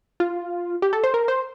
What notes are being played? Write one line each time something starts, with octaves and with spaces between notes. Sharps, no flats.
F4
G4
A4
C5
A#4
C5